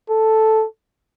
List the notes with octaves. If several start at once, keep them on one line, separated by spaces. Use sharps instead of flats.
A4